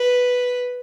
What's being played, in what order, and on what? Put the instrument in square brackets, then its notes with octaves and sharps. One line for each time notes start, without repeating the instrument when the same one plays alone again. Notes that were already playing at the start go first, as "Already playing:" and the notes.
Already playing: [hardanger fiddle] B4